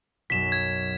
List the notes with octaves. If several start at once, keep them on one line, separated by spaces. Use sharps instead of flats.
B1 F#2 B6 E7
G#6